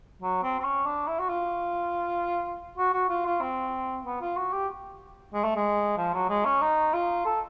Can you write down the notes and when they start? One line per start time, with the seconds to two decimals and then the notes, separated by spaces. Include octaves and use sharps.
0.22 F#3
0.43 C4
0.59 C4
0.64 C#4
0.86 D4
1.07 E4
1.19 F#4
1.29 F4
2.78 F#4
2.93 F#4
3.09 F4
3.26 F4
3.41 C4
4.05 B3
4.21 F4
4.37 F#4
4.53 G4
5.34 G#3
5.44 A3
5.56 G#3
5.98 F3
6.14 F#3
6.29 G#3
6.45 C#4
6.62 D#4
6.93 F4
7.26 A4